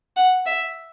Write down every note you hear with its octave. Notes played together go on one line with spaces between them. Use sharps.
F#5
E5